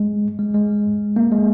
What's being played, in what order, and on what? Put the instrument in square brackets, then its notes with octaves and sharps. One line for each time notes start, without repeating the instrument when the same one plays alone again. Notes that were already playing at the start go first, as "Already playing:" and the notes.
Already playing: [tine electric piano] G#3
G#3
G#3
A#3
G#3